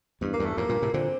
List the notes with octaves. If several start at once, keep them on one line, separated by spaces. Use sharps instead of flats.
E2 G2
A#3
E2 G2
A3
F2 A2 A#3
G2 A#2
A2 C3
A#2 D3 C4